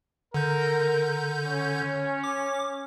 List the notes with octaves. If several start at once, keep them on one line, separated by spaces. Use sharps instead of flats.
D3 A#4 G6
C#4
D6